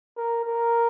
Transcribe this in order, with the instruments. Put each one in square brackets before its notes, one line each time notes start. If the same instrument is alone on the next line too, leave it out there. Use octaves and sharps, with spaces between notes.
[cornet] A#4
A#4